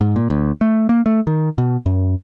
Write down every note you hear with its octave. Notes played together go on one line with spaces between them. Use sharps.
G#2
A#2
D2
A3
A#3
A3
D#3
B2
F#2